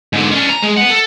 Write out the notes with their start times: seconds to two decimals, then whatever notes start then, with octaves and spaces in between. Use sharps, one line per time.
0.13 G#2 D3
0.31 C#4 D4
0.49 A#5
0.62 G#3
0.77 B3 F#5
0.90 A4